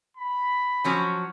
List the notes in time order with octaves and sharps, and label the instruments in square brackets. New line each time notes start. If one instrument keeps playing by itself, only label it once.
[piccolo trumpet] B5
[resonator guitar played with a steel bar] F3 F#3 C#4